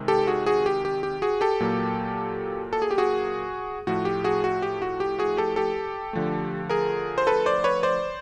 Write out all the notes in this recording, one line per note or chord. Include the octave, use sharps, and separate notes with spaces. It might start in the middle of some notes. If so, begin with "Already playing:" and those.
Already playing: C3 D#3 G#3
G4 A4
F#4 G#4
F#4 G#4
G4
G4
G4
F#4 G#4
G4 A4
A#2 F#3 A#3
A4
G#4
G4
F#4 G#4
A2 F3 A3 F#4
G4
F#4 G#4
F#4
G4
F#4
G4
F#4 G#4
G4 A4
G4 A4
D3 F3 A3
G#4 A#4
C5
A4 B4
C5 D5
B4 C#5
C5 D5